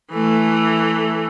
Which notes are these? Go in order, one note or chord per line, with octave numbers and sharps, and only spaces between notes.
E3 A3